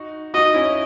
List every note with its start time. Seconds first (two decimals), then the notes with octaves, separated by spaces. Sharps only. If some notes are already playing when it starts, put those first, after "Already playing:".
Already playing: D#4 F#4
0.34 D#4 F#4 D#5
0.54 C#4 E4